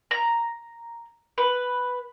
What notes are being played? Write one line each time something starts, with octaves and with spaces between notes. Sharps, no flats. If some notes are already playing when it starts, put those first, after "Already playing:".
A#5
B4